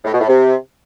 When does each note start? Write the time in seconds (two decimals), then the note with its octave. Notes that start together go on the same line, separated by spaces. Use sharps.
0.05 A2
0.13 B2
0.21 A2
0.28 C3